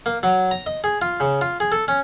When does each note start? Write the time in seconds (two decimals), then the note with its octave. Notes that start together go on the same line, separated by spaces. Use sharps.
0.06 A#3
0.23 F#3
0.51 A#5
0.66 D#5
0.84 G#4
1.02 F4
1.20 C#3
1.41 F4
1.60 G#4
1.72 A4
1.88 C#4